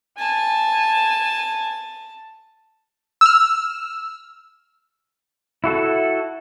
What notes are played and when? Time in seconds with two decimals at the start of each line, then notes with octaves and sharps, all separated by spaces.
0.19 G#5 A5
3.21 E6 F6
5.64 E4 F#4 A4